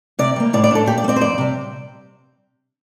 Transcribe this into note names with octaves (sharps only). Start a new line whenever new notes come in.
C3 D5
G3 A#3
A2 D5
D5
A3 D4 A4
A#2 G4
D5
A3
C4 D5
C5
F2 D5
C3 G3